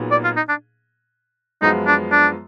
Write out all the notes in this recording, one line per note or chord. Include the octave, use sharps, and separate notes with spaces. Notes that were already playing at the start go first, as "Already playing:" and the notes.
Already playing: A#2 F#3 B3 D#4 G#4
D5
F4
D#4
D4
F#2 F3 G#3 B3 D#4 F4
D4
D4